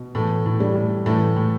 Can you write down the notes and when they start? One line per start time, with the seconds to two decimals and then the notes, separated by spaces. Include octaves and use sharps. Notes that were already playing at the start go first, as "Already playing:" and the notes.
Already playing: B2
0.15 A2 E3 A3
0.46 A2
0.60 G3
0.75 A2
1.06 A2 E3 A3
1.36 A2